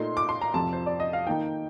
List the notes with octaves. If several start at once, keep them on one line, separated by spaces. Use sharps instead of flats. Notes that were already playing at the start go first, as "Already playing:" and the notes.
Already playing: A#2 A3 D#4 C6
D6
C6
A#5
F2 C3 F3 A5
C5
D5
D#5
F5
D#3 A#3 D#4 G5